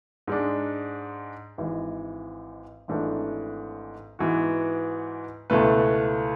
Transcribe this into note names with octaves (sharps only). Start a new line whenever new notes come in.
G#2 G#3 D4
G#1 G#2 E3
G#1 G#2 E3 A3 D4
G#2 E3 B3 F#4
C#2 B2 A3 E4 B4